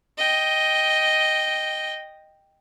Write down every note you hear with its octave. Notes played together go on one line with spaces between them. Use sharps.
D#5 G5